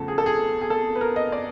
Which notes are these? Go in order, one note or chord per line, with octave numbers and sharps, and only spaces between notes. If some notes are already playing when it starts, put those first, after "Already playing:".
Already playing: E2 C#3 F3 A3 A4
G#4
A4
G#4
G#4
A4
B4
A#4
D#5
D5